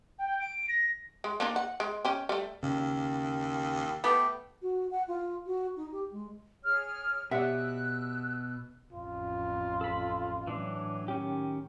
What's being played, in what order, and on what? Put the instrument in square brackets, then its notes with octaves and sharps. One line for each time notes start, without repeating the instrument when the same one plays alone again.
[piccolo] G5
D7
A#6
[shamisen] G#3
A#3 D4 D#4
F#5
G#3
C#4 G4
G3 A3
[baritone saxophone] D#2 [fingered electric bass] C#3
[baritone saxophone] A3 [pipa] B3 G4
[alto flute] F#4
F#5
F4
F#4
D#4
G4
G#3
[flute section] G#4 C#5 F6
[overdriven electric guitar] B2 [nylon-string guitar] G4 C#5 D5 [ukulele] E5 F#5 [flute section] E6 F#6
[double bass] A1 F2 [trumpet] F4
[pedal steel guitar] A4 B5
[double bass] A2 F#3 [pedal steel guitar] E3 D4
[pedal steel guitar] D#3 C#4 G4